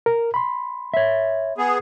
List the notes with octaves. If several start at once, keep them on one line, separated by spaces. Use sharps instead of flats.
A#4
B5 C6
C#5 E5
B3 G#4